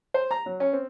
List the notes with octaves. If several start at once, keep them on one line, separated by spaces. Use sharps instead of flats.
C5
A#5
F#3
C#4
C4